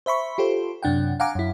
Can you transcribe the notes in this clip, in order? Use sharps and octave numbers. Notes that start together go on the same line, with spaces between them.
C5 E5 B5 C#6
F4 G4 A4 C5
F#2 C3 D4 F#5 G5
F5 F#5 G#5 A#5 D6
F#2 E4